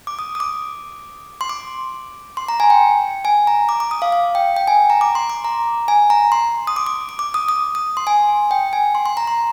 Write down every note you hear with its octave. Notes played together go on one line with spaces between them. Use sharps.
D6
D#6
D#6
D6
C6
D6
C6
A#5
G#5
G5
G#5
A#5
D6
D6
D#6
F5
F5
G5
G5
G#5
A#5
D6
C6
D6
A#5
G#5
A#5
C6
D#6
D6
D6
D6
D6
D#6
D#6
D#6
C6
G#5
G5
G#5
C6
C6
A#5
C6